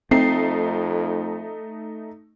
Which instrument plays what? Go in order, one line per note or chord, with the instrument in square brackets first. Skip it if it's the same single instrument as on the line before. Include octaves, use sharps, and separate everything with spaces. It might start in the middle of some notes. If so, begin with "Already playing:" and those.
[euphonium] F2 [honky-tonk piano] A3 D#4 C7 [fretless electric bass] C4